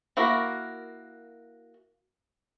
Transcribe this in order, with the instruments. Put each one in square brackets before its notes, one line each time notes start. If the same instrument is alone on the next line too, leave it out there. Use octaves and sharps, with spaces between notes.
[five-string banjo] A#3 E4 F#4 A#4